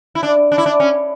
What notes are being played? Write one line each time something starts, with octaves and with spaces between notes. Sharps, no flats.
E4
D4
D4
E4
D4
C#4